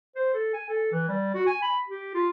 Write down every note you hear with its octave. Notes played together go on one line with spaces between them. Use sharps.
C5
A4
G#5
A4
E3
G3
F#4
G#5
B5
G4
F4